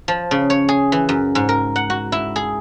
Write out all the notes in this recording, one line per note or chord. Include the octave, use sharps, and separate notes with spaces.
F3
C#3
C#5
G#4
E3
F#2
G#2
A#4
F#5
F#4
E4
G#4